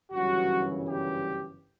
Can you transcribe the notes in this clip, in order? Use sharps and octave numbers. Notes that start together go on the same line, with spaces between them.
G1 F#2 C#3 E3 F#3 G3 F#4
G3 G4